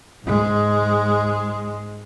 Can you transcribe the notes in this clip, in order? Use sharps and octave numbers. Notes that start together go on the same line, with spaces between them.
G#2 G#3